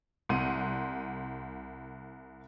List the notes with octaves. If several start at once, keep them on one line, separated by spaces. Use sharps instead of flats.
C2 F#5 C6 D#7